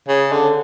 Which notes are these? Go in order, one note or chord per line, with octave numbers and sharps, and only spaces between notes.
C#3
D3